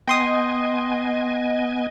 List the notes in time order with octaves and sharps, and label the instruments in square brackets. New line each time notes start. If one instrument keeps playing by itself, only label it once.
[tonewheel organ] B3 G#5 [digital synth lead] D#5 [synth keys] G5 C6 D#6